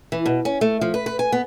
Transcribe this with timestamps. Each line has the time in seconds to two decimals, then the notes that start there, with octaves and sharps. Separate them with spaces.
0.12 E3
0.26 B2
0.45 C#4
0.61 A3
0.81 F3
0.94 B4
1.06 B4
1.19 G#5
1.32 B3